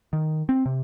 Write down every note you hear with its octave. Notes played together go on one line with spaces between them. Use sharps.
D#3
C4
C3